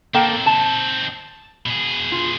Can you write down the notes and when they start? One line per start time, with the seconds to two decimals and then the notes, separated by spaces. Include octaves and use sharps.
0.14 A#3 C4 D#4 A4 G5
0.46 A5
1.66 B2 G#4
2.12 F4